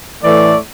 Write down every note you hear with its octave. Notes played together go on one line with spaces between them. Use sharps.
A2 E3 A3 D5